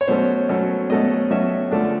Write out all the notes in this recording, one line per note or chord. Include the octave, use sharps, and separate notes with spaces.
C#5
B2 F#3 A3 C#4 C5
B2 F#3 A3 C#4
B2 F#3 A3 C#4 D#5
B2 F#3 A3 C#4 E5
D3 F3 A3 D4